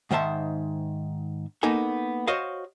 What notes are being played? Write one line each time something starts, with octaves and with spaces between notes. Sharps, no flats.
G#2 D#3 C5 E5 A5
A#3 B3 D#4 A4 G#5
F#4 C5 C#5 D#5 F5